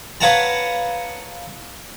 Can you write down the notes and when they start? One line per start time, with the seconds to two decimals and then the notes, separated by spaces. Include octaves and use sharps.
0.21 B4 C#5 F5 F#5 A5 A#5